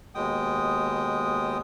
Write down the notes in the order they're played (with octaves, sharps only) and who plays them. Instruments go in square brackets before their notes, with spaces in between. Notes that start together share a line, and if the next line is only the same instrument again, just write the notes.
[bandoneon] D#2 B2 G#3 G5 D#6